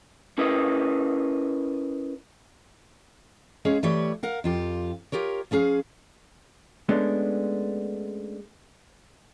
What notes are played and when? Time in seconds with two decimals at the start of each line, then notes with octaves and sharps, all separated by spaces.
0.38 C#4 E4 A#4 B4 D#5
3.65 G#3 C#4 G#4 C#5 F5
3.83 E3 G3 A3 G4 C#5
4.23 A#4 F5 F#5
4.44 F2 F4 G4
5.12 F4 G4 A#4 C#5
5.51 F3 C#4 G#4 F5
6.89 G#3 A3 B3 C#4 D4